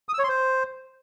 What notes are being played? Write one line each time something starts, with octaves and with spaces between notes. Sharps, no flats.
D#6
E6
C#5
C6
C5